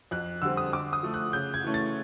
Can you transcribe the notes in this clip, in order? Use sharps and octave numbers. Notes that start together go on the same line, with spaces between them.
F2 F#6
D3 G3 C4 E6
D#6
D3 D6
D#6
F3 A3
F#6
C#3 G6
G#6
E3 A3 C#4
A6